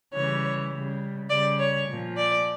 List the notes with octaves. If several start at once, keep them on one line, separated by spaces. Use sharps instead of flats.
C#3 E3 G3 C#5
C#3 G3
C#3 G3 D5
C#5
A#2 F3
D5